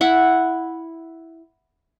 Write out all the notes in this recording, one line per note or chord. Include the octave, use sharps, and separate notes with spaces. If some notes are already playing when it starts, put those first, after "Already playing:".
E4 F#5